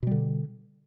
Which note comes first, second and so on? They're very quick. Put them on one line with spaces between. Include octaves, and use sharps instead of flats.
B2 G3 D3